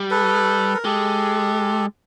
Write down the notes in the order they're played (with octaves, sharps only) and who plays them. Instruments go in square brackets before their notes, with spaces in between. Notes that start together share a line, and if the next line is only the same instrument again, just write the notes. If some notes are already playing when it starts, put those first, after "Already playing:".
Already playing: [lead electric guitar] G3
[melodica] A4 B4
A#4
[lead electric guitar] G#3 [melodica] G4 A4